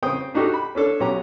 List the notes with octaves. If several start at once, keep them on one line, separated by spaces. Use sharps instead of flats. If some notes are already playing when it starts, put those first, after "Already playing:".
C#3 C4 C5 G5 D#6
D4 D#4 F#4 G4 A4
B5
C#4 D4 A4 C#5
B1 C#4 F#4 G4 A#5